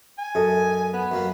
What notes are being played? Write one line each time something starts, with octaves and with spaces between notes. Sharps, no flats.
G#5
F#2 A4 D#5
B3
F#2 F#3 A#3